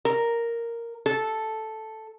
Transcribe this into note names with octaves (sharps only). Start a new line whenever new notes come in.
A#4
A4